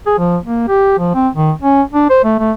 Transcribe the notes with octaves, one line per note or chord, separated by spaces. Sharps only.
G#4
F3
A#3
G4
F3
C4
D#3
C#4
D4
C5
A3
A3